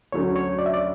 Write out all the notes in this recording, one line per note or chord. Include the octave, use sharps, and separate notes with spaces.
D2 D3 F#3 C#4 C#5
C#5
D5
E5
D5